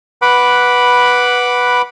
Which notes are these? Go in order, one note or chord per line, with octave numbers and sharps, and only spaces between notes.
B4 F#5 B5 D6